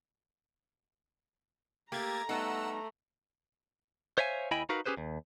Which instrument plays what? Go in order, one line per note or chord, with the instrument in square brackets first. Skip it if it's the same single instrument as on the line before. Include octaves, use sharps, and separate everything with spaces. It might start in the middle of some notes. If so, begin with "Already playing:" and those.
[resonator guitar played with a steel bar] A3 A#3 [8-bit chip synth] G4 G#6 A6 [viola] A#5
[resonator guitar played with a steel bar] G3 B3 D#4 [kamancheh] A3 [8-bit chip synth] F#5 E6
[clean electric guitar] C5 C#5 E5 F5 G#5
D#2 E4 D#5 G5 G#5 B5
D#4 F#4 A#4 B4 F5
C#4 G4 G#4 B4 C5
D#2